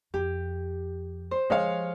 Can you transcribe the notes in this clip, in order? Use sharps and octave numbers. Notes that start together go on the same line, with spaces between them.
F2 G4
C5
F3 G#3 C#5 F5